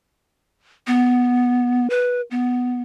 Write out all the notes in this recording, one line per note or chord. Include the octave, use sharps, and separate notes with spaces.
B3
B4
B3